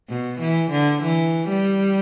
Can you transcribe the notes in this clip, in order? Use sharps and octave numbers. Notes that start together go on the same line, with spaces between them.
B2
E3
D3
E3
G3